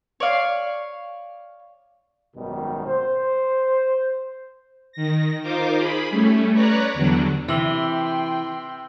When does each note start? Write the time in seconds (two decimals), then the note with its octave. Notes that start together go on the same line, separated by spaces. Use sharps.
0.20 C#5 D5 F5
2.36 G#1 F#2 B2 D#3 G3
2.87 C5
4.92 D#3 A#6
5.42 D#4 F4 A#4 C5 D6
5.76 G#4 B5
6.10 G3 A3 C#4
6.54 B4 C#5 D5 A#5 F#6
6.94 E2 D3 F#3 G3 D4
7.48 C3 E3 G5 C6 E6 F#7 G7